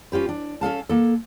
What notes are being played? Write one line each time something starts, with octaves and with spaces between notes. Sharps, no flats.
C#4 F4 G4 B4
D4
C#4 A4 F5 A5
A#3 A4